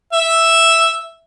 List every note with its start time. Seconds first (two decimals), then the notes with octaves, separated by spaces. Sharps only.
0.13 E5